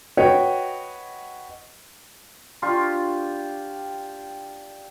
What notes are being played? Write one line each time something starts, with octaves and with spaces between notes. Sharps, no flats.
F#4 B4 C#5 D#5 G5
D4 F4 G4 C#6